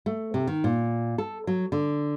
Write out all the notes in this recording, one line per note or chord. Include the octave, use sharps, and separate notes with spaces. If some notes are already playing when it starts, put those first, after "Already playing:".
A3
C3
D#3
A#2
A4
F#3
D3